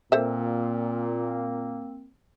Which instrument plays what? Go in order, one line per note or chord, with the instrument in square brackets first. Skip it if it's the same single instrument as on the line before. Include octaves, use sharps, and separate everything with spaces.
[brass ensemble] A#2 [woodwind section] A#3 C4 [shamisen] A4 C5 E5